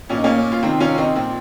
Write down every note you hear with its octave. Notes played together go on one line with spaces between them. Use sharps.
A#2 F3 C#4
D#4
A#3 C#4
F4
C3 D#3 C4 D#4
C#4 F4
C4 D#4
A#2 F3 C4